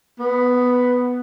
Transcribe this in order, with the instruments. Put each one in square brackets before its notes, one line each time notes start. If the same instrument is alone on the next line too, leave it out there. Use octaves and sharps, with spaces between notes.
[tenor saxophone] B3